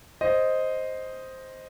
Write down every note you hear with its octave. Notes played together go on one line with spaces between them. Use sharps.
C5 D#5